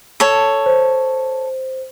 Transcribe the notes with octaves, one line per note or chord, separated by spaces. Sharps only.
A4 C#5
C5